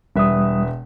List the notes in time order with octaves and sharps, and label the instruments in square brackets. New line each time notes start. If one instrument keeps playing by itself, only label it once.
[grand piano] E1 B4 E5 [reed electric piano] G3 D#6